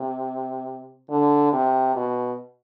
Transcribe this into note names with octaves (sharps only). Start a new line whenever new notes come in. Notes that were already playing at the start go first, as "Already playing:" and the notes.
Already playing: C3
D3
C3
B2